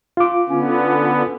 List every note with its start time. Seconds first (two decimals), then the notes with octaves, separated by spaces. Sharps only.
0.17 F4 D6
0.49 D3 B3 C#4